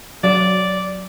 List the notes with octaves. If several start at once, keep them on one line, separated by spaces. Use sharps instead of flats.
F#3 D5